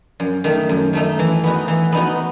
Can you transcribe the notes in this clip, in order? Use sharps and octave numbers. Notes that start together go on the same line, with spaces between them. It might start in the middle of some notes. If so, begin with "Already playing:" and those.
F#2
D#3 A3 D#4
F#2
D#3 A3 D#4
E3
B3 D#4 F#4
E3
B3 D#4 F#4